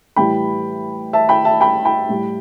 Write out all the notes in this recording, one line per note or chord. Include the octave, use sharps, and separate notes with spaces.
A2 E3 G3 G5 B5
E5 A5
G5 B5
E5 A5
G5 B5
G5 B5
A2 G3